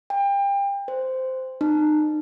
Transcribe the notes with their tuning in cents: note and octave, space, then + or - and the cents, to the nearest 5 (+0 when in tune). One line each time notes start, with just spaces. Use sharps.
G5 +30
C5 -10
D#4 -35